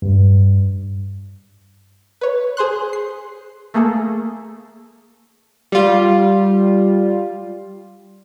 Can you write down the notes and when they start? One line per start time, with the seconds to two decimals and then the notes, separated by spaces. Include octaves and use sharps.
0.02 G2
2.21 B4 C#5
2.57 G#4 C5 C6 F#6
2.93 C7
3.74 A3 A#3 G#4 A4
5.72 G3 F4